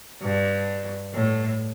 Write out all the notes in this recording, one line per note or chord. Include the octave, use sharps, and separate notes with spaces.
G2
A2